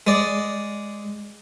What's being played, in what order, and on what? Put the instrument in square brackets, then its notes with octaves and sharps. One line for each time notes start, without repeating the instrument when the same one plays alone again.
[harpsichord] G#3 D5